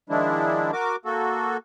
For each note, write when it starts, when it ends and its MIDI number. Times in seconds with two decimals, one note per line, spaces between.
0.10 0.71 51
0.10 0.71 53
0.10 0.71 56
0.10 0.71 62
0.10 0.71 64
0.73 0.96 66
0.73 0.96 70
0.73 0.96 86
1.05 1.57 58
1.05 1.57 66
1.05 1.57 69